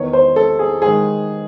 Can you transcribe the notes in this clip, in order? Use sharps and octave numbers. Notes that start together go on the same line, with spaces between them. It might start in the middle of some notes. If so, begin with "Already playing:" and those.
Already playing: E2 D#3 C#5
C5
A4
G#4
G#2 D#3 G#4